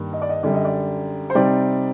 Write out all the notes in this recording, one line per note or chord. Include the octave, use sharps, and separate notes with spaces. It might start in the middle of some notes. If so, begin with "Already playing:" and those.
Already playing: G2 D#3 G3 A#3
D#5
D5
D#5
F#2 D3 G3 D5
D#5
D5
C5
C3 G3 C4 D#4 D5